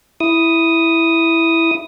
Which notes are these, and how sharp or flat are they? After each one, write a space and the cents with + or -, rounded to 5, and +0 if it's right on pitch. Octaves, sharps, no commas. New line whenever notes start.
E4 +0 D#6 +0